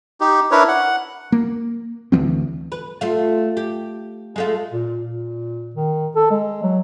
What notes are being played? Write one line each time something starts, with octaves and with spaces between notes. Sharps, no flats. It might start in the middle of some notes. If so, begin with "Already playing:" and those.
D#4 G4
D4 E4 A#4 B4 C#5
F#5
A#3
D2 E3 F#3 C4
B4
A3 F4
G4
G#3 A3 F4
A#2
A#2
D#3
A4
G#3
F#3